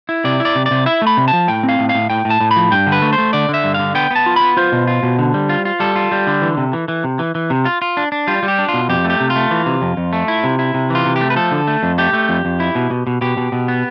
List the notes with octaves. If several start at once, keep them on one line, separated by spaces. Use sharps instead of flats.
E4
C3 D5
E4
D5
C3
D5
C3
E4 E5
A3
B5
C3
A5
F3
A2 G5
C4
F5
A2
F5
A2
A2 G5
A2
A5
A2
B5
F3
G2 G5
D3
B4
A3
C5
A3
D3 D5
D3
E5
G2
D3 F5
B3 G5
B3 A5
F4
B3 B5
F4 C5
B2
F4
B2
D3
G3
F4
F4
G3 A4
F4
G3
D3
E3
C3
E3
E3
C3
E3
E3
C3
F4
F4
D4
D4
G3 F4
G3
G4
D4
F4
B2
F2 G4
A3
G4
C3
F4
A3
E3
C3
F2
F2
A3
E4
C3
E4
C3
E3 F4
C3
G4
A3
B4
F3 A4
D3
A3
F2
A3 G4
A3
F2
F2
E4
B2
B2
B2
B2 G4
B2
B2
B3